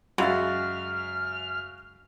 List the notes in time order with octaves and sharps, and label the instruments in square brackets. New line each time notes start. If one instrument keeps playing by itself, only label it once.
[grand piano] F#2 E5 A6 [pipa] C#3 G#3 [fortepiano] F#4 F5 [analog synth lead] F6